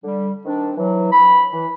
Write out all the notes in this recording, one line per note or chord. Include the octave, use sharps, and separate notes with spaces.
D3 G3
D#3 C4 D4
E3 F#3
B5
E3